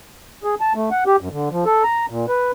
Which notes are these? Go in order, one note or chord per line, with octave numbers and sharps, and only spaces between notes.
G#4
A5
A3
F#5
G4
F#2
D3
F3
A4
A#5
A#2
B4